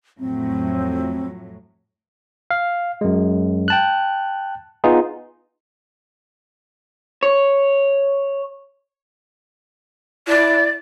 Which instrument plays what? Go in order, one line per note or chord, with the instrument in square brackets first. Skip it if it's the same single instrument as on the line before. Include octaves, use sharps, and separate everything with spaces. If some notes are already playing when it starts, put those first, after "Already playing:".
[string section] F2 A2 F#3 [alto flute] C4
[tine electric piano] F5
F#2 G#3
G5 A5 F#6
B3 D#4 F4 G#4
[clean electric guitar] C#5
[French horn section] E4 [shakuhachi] D5